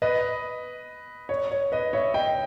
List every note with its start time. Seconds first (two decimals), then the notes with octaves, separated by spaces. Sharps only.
0.02 B4 D#5
1.29 C#5
1.51 C#5
1.72 B4 D#5
1.93 C#5 E5
2.14 D#5 G5